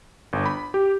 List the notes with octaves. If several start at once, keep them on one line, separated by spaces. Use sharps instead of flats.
G1
B5
G4